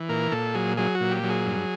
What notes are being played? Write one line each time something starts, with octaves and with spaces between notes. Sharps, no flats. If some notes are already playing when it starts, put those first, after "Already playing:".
Already playing: E3
A#2 A#4
A#2 A4
F#3 G#4
F#3 G#4
F#4
A#2
G4
F#3
G#4
G2